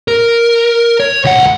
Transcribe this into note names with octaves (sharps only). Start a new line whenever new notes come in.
A#4
C#5
C#2 F#5